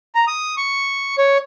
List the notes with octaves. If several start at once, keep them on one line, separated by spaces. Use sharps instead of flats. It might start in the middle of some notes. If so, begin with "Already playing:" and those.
A#5
D#6
C#6
C#5